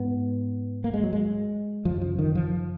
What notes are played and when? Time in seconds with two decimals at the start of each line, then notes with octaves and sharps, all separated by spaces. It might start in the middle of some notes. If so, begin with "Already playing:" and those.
Already playing: G#2 B3
0.84 A#3
0.94 G#3
1.03 F#3
1.13 G#3
1.85 F#2 C#3 F3
2.02 F3
2.19 D#3
2.35 F3